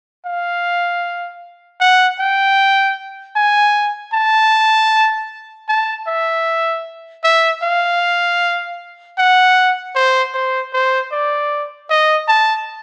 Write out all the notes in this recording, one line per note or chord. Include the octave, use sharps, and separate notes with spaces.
F5
F#5
G5
G#5
A5
A5
E5
E5
F5
F#5
C5
C5
C5
D5
D#5
A5